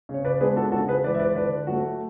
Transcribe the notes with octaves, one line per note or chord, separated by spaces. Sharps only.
C#3 C#5
B4 D5
G#3 B3 D4 G#4 B4
F#4 A4
C#3 F#4 A4
G#4 B4
E3 G#3 B4 D5
E5
B4 D5
D3 B4 D5
F#3 A3 F#4